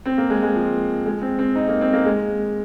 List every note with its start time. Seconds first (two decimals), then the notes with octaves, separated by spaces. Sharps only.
0.06 C4
0.18 A#3
0.30 G#3
0.43 G#3
0.55 F3
1.06 G#3
1.22 C4
1.39 C4
1.56 D#4
1.68 A#3
1.81 C4
1.93 A#3
2.05 G#3